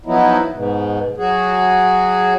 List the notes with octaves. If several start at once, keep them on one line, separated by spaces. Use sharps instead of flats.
F3 F#3 B3 D#4 E4
G#2 B2
F#3 F#4 G#4